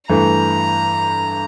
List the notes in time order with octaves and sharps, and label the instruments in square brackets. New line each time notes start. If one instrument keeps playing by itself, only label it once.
[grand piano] G2 E3 A3 [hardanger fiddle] A#5